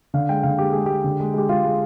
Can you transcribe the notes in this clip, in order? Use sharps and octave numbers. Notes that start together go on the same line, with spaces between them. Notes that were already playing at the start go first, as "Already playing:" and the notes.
D3 F5
G#3 G5
D3 F5
G#3 G4
G#3 G#4
G#3 G4
D3
G#3
G#3 G4
G#3 F4
G#3